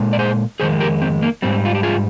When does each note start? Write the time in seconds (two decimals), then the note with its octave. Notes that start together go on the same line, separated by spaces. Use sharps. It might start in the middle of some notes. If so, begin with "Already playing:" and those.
Already playing: A#2 G#3
0.13 D5
0.19 G#4 C5
0.60 F2 D#3 G#3 G#4 C5
0.80 G4 A#4
1.02 C4
1.22 A#3
1.42 G#2 G3 C4
1.65 F4
1.75 G4
1.83 F4 G#4